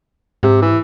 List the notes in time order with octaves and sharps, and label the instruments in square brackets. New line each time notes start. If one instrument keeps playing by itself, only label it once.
[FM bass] G#2 [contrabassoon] C3
[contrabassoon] E3